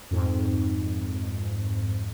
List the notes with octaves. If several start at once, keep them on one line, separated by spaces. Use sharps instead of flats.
F2 G#2